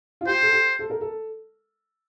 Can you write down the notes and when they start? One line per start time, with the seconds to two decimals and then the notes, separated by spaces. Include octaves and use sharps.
0.21 F4
0.27 G4 C5
0.42 A4
0.52 G4
0.79 A4
0.90 A#4
1.01 A4